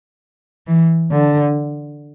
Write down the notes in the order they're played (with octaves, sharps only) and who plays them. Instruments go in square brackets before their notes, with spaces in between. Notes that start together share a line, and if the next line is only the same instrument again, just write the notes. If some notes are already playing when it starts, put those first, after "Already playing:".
[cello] E3
D3